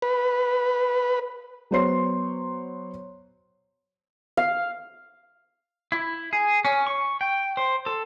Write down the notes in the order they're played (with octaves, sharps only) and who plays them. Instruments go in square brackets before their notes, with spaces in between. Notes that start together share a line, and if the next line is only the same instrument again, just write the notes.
[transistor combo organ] B4
[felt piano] F#3 B3 C5 C#5 C6 C7
[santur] F5
[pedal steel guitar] E4
G#4
C#4
C#6
G5
C5
A4